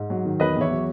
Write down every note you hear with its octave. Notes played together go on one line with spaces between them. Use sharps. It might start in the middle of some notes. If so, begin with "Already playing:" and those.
Already playing: G#2
F#3
D#3
E1 B4 D#5
E2 C#5 E5
F#3